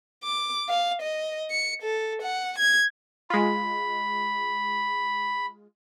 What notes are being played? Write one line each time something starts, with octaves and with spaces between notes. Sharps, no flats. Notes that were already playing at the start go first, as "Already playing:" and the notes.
D6
F5
D#5
C#7
A4
F#5
G#6
G#3 F4 B5